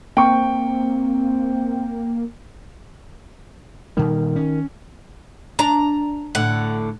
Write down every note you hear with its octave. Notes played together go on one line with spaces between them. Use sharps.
A#3 C4 G5 C#6
A#2 D#3 G3
C#4
D4 A#5
A2 D3 F#5